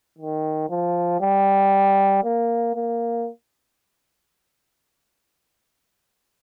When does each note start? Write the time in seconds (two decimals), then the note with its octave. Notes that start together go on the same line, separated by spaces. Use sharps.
0.18 D#3
0.69 F3
1.21 G3
2.24 A#3
2.75 A#3